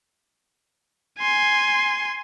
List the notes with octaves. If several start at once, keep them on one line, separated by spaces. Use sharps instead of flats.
G#5 C6